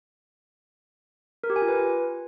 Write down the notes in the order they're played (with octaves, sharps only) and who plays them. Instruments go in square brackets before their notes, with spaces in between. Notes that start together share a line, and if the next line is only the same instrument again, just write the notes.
[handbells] A#4
G4
G#5
F4
B4